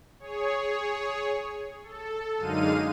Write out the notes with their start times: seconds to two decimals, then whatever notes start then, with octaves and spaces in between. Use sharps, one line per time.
0.19 G#4 C#5
1.83 A4
2.38 F#2 D3 G#3 D#4 F5 D#7